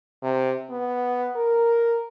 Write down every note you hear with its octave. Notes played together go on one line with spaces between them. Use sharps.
C3
B3
A#4